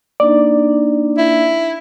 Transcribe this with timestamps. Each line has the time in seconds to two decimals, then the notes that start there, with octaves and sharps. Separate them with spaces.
0.20 A#3 D4 D#4 D5
1.18 E4